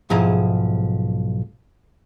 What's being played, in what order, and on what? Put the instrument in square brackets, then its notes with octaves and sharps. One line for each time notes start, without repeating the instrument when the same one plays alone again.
[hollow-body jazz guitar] B1 G#2 F3 E4 G#4 A#5